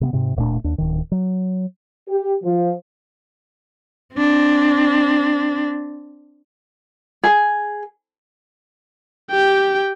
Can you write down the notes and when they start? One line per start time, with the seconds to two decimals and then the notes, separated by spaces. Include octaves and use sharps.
0.01 C3 A#3 B3
0.13 G#2 C3
0.36 D1 A#2 A3 D4
0.64 D#2 D4
0.78 D1 D#3
1.12 F#3
2.09 G4
2.44 F3
4.15 C4 D4
7.24 G#4
9.31 G4 G5